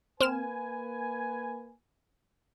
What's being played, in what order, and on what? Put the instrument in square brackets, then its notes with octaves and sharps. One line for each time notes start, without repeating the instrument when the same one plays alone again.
[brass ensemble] A#3 B4 G#5 [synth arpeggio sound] C4 F6 E7